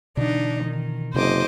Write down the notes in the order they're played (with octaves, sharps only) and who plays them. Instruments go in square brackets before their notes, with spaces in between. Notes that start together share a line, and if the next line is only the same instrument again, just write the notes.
[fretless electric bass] B2 D3 E3 [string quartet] D4 D#4
[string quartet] D#3
[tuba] F#1 [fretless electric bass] C3 [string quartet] C5 D#5 D6